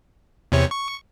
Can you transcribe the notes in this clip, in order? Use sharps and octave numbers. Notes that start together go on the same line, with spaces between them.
E2 C3 C#5
C#6